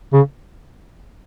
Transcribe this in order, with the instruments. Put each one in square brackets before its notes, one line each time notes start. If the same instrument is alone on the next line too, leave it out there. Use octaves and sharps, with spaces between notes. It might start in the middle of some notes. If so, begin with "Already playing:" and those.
[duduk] C#3